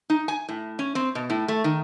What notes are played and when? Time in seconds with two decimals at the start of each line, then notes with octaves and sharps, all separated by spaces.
0.10 D#4
0.28 G#5
0.49 A2
0.79 C#4
0.95 C4
1.15 B2
1.30 A2
1.48 A3
1.64 D#3